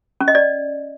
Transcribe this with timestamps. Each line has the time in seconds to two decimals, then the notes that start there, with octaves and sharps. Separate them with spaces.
0.21 C#4
0.28 D#5
0.35 D5